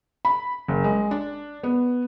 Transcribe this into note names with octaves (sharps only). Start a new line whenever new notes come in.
B5
F#1
G#3
D4
B3